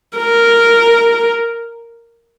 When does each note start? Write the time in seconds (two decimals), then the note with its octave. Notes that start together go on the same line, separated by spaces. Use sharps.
0.18 A#4